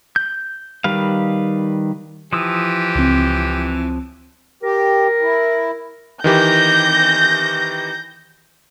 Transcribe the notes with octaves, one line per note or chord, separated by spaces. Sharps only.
G6
D#3 G3 B4 F5
E3 F3 G4 D#6 E6
C#2 C4
G4 A#4
E4
D#3 E3 G4 G6 A#6